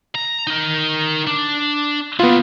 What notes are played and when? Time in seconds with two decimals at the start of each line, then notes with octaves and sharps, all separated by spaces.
0.15 A#5
0.47 D#4 A#4
1.27 D4
2.19 A#3 B3 E4 F4